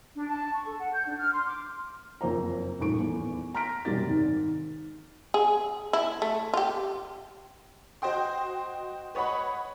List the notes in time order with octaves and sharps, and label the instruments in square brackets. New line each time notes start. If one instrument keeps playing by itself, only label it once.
[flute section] D4
A5
C#6
A4
F#5
G6
D4
F6
C6
D6
[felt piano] F#1 F2 A#4 C5 A#5
D#1 A1 G#2 A4 C#6 D7
E2
A#5 C6 F6 A#6 B6 D7
E1 F#2 C3 G3 A6
G#2 D#3
[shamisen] G#4
E4
A3
F4 G4
[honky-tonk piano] F#4 C5 D#5 G5 C6
B4 C#5 D#5 F#5 B5